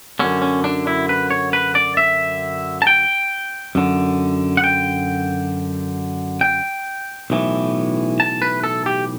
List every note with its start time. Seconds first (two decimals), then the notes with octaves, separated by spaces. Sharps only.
0.19 F#2 D3 C#4
0.42 C#4
0.64 D4
0.87 E4
1.09 B4
1.30 C#5
1.53 B4
1.75 D5
1.97 E5
2.82 A5
2.87 G5
3.75 F#2 D3
4.57 F#5
4.64 G5
6.41 G5
7.30 B1 A2 E3
8.20 A5
8.42 B4
8.63 A4
8.86 G4